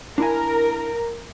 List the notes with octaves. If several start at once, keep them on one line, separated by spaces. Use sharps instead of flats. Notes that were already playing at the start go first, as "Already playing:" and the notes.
D4 E4 A#4 G#5